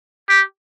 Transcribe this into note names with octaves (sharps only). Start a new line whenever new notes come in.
G4